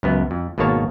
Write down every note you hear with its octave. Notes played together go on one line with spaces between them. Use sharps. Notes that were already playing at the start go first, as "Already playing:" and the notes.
C#2 F#2 B3
F2
G#1 B2 D#3 A#3 C#5 A5